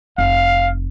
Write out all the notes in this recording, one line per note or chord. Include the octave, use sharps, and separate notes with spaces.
F1 F5